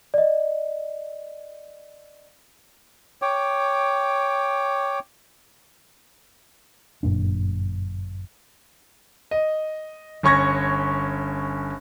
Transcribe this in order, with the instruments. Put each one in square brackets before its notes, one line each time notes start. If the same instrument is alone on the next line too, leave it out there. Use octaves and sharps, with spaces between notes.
[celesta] D5 D#5
[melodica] C#5 G5 D6
[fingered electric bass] G1 F#2 A#2 D4
[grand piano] D#5
G1 C#4 C#6 G#6 A#6